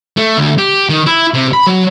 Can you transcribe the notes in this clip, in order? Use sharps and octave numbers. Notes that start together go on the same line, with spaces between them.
A3
D2
G4
D#3
E4
C3
B5
F#3